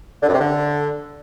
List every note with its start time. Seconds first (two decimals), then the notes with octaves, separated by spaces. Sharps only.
0.22 D3
0.28 F#2
0.34 C3
0.40 D3